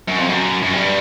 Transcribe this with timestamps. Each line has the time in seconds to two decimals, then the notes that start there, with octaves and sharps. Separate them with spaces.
0.08 F#2
0.18 F2
0.29 F#2
0.63 F#2
0.73 G2